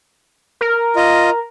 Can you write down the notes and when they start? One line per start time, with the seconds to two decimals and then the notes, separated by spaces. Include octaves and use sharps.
0.61 A#4
0.96 F4 D#5